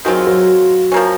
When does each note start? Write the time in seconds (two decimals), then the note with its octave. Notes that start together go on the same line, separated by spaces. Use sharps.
0.05 D#3 F#3 G#3 C4 F4
0.27 F#3
0.92 F3 A#3 C#4